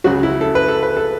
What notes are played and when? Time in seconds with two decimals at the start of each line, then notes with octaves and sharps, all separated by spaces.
0.04 C#2 C#3 F#3 F#4
0.23 E4
0.41 A4
0.55 B4
0.68 A4
0.83 B4
0.97 A4